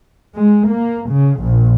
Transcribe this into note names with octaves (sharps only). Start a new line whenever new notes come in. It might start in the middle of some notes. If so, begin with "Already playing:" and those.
G#3
A#3
C#3
A#1